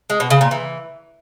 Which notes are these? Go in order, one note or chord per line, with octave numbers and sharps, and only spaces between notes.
G#3
B2
C#3
A#2
E3